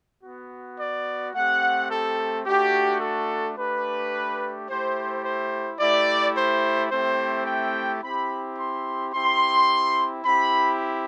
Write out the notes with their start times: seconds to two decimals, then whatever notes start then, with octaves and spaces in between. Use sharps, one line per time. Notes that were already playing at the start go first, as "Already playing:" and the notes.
0.22 B3 F#4
0.79 D5
1.34 A3 C4 G4 F#5
1.90 A4
2.46 A3 D4 F#4 G4
3.00 A4
3.57 A3 D4 G4 B4
4.68 A3 E4 G4 C5
5.23 C5
5.79 A3 E4 G4 D5
6.35 C5
6.90 A3 C4 E4 G4 C5
7.46 G5
8.02 C4 E4 G4 B5
8.57 C6
9.13 C4 E4 G4 C6
10.24 C4 E4 G4 B5